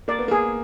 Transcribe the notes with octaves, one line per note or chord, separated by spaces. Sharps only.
A#3 D5
B3
A#3 G#4